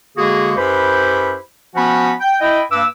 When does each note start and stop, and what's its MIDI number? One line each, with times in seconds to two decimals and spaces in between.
0.17 0.53 50
0.17 0.53 56
0.17 0.53 58
0.17 0.53 66
0.17 0.53 68
0.57 1.37 42
0.57 1.37 64
0.57 1.37 67
0.57 1.37 71
0.57 1.37 72
0.57 1.37 83
1.75 2.12 53
1.75 2.12 59
1.75 2.12 61
1.75 2.12 66
1.75 2.12 78
1.75 2.12 83
2.21 2.37 79
2.41 2.61 64
2.41 2.61 75
2.41 2.61 79
2.72 2.85 43
2.72 2.85 58
2.72 2.85 71
2.72 2.85 86
2.72 2.85 88